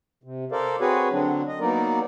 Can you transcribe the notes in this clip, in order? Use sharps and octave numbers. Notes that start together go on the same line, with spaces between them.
C3
A4 A#4 C5 D5 F5
C4 F#4 G#4 B4 C#5
D3 F#3 C4 D4
D#5
F#3 A#3 B3 D#4 A#4 D5